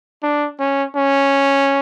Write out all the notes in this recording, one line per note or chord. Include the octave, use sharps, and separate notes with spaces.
D4
C#4
C#4